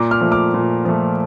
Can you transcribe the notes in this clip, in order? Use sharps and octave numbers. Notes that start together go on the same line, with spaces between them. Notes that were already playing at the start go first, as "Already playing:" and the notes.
Already playing: A#2 A#5 D6
D6 F6
F3 A3
D6 F6
A#2
F3 A3